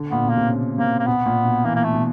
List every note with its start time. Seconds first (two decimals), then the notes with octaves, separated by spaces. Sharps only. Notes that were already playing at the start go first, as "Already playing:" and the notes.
Already playing: D3
0.11 A#2 B3
0.25 B2 A#3
0.37 C3
0.49 C#3
0.78 C3 A#3
0.99 A#3
1.07 B2 B3
1.26 A#2
1.45 B2
1.65 E3 A#3
1.75 A#3
1.84 A3
1.94 B2